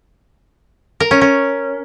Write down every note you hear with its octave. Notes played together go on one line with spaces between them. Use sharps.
A#4
C#4
C#4